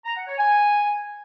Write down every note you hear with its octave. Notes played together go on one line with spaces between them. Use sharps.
A#5
F#5
C#5
G#5